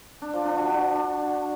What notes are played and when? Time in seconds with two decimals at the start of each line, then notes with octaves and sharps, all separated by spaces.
0.22 D4
0.33 F3
0.45 D4
0.57 F#4
0.68 D4